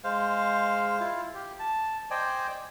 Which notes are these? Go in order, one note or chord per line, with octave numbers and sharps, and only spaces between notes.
G#3 C5 F5
E4 F4
G4
A5
C5 D5 D#5 G5 G#5